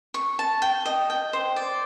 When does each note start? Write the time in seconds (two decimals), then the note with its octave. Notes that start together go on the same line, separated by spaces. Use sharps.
0.14 C#6
0.39 A5
0.62 G5
0.86 D#5
1.10 G5
1.33 C5
1.56 D5